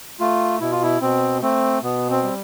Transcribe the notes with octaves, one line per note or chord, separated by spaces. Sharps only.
A3 F4
B2 E4
F4
E4
B2 C4
A3 C4
B2 B3
C4
G3